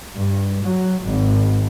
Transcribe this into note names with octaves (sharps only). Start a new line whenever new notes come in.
G2
F#3
G#1